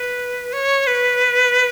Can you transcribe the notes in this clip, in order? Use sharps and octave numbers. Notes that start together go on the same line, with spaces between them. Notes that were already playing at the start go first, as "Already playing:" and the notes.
Already playing: B4
C#5
B4